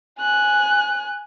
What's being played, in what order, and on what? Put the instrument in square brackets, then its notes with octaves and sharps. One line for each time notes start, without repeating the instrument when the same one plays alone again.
[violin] G#5 F#6